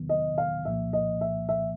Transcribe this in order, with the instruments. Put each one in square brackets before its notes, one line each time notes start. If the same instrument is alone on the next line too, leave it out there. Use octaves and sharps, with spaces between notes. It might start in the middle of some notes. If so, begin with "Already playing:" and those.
Already playing: [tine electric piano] E2 C3 D#3 F#3 B3
[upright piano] D#5
F5
[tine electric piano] C2 A#2 F3 A#3 [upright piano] E5
[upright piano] D#5
E5
E5